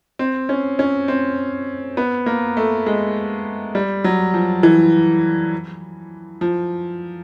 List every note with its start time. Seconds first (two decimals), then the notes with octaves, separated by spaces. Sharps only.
0.19 C4
0.49 C#4
0.79 C#4
1.08 C4
1.97 B3
2.26 A#3
2.57 A3
2.86 G#3
3.75 G3
4.04 F#3
4.34 F3
4.63 E3
6.41 F3